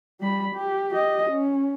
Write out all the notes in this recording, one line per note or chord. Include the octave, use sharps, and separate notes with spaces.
G3 B5
G4
G4 D#5
C#4